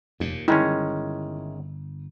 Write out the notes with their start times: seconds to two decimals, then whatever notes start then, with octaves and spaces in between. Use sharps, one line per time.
0.20 F1 D#2 A#2
0.48 G1 D#3 G#3 C#4 E4